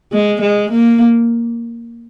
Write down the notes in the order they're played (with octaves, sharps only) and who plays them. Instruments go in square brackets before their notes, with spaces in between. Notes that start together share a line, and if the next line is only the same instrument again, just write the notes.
[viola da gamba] G#3
G#3
A#3